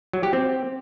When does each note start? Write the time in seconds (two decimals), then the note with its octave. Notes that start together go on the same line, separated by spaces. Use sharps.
0.13 F#3
0.23 G4
0.33 C4